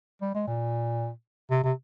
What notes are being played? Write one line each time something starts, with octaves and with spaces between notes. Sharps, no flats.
G3
G#3
A#2
C3
C3